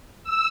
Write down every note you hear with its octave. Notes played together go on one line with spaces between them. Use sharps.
E6